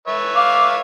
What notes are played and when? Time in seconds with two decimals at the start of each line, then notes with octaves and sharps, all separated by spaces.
0.08 B4 C#5 E5
0.35 F5 D6